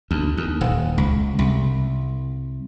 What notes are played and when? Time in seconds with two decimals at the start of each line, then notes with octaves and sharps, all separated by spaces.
0.11 D2
0.37 D#2
0.61 D#1
0.98 C#2
1.39 C2